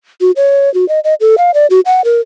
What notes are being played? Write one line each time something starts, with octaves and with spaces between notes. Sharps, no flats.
F#4
C#5
F#4
D#5
D#5
A4
F5
D5
F#4
F#5
A#4